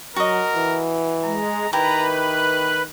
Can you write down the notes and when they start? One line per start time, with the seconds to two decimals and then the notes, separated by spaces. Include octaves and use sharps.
0.16 F#3 F#4 A#4 D#5
0.56 E3
1.24 G#3 A#5
1.73 D#3 E4 G4 B4 A#5
2.16 F#6